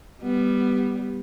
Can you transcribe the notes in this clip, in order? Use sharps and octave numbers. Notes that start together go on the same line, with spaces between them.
G3 B3